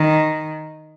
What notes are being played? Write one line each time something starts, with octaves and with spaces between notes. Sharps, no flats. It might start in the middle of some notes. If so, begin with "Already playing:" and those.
Already playing: D#3